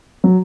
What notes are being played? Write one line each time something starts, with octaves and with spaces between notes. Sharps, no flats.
F#3